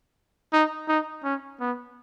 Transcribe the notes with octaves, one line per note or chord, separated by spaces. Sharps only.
D#4
D#4
C#4
B3